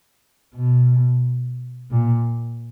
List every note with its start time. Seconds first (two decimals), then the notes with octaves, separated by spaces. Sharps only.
0.55 B2
1.91 A#2